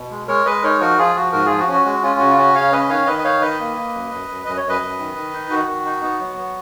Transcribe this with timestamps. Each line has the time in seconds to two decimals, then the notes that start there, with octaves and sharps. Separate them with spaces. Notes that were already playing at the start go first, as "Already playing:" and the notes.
Already playing: B2
0.11 G#3
0.28 G#3 A#4 C#5
0.46 G#3 B4 D#5
0.63 D#4 A#4 C#5
0.80 F3 F#4 A#4
0.98 F3 F4 G#4
1.15 F3 F#4
1.32 G#2 F#4 A#4
1.46 F3 F4 G#4
1.59 F#4
1.67 C#4
1.72 F#4
1.85 G#3 F#4
2.03 C#4 F4
2.20 C#3 F#4
2.30 F4
2.37 C#4 F#4
2.54 C#3 C#5 F5
2.72 C#4 B4 D#5
2.89 D#3 C#5 F5
3.07 D#3 B4 D#5
3.18 D#5
3.24 D#4 C#5 F5
3.41 D#3 B4 D#5
3.59 A#3
3.76 A#3
3.94 F#2
4.11 F#2
4.28 F#2
4.46 F#2 D#5
4.57 C#5
4.63 F#2
4.69 B4 D#5
4.81 F#2
4.99 D#3
5.15 D#3
5.33 D#4
5.50 D#3 F#4
5.68 D#3
5.86 D#4
6.03 B3
6.20 F#3
6.38 B3